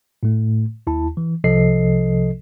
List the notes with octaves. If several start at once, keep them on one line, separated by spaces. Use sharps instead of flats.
A2 A3
D#2 E4 A5
E3
C2 C3 F3 A4 D#5 C7